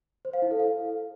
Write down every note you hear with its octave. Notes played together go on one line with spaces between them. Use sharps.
C5
F5
E4
A4
F5